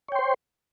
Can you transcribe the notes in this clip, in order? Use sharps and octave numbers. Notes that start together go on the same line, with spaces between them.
C5 C#5 G5 C6